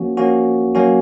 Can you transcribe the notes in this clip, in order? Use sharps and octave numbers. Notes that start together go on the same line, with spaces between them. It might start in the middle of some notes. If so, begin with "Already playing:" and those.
Already playing: F3 A#3 C#4 F#4
F3 A#3 C#4 F#4
F#3 A#3 C#4 F#4